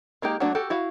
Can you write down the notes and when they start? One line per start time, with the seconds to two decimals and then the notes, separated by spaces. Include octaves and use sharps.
0.22 G#3 A#3 D#4 G4
0.40 F#3 A3 A#3 D4 F#4
0.55 F#4 G4 A4
0.70 E4 F#4 F5